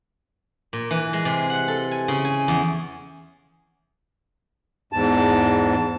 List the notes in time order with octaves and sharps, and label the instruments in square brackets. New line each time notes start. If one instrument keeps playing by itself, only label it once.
[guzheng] A#2
E3
G#3
C3
F#5
A4
G#5
C#3
G#5
E2
[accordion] E2 G#2 A5